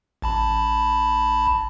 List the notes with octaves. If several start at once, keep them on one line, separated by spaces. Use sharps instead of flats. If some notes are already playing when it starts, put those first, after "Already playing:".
A1 A5 B5